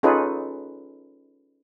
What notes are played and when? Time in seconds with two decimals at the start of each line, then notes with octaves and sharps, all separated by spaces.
0.03 C#4 D#4 F4 G#4 A4 B4